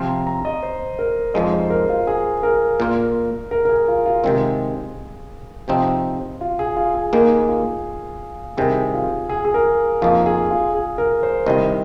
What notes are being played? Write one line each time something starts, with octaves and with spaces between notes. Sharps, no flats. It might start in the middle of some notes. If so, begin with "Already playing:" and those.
Already playing: C3 F3 C4 F4 C6
A#5
A#5
D#5
C5
A#4
F2 F3 G#3 D#4 D#5
C5
A#4
F4
G#4
A#4
A#2 A#3 F4
A#4
A#4
G#4
F4
F4
C3 D#3 G#3 C4 G#4
C3 F3 C4 D#4
F4
G#4
F4
G#4
D#2 D#3 A#3 G#4
F4
C2 C3 D#3 G#4
F4
G#4
G#4
A#4
F2 F3 A#3 D#4 F4
G#4
F4
G#4
A#4
C5
C2 C3 D#3 D#5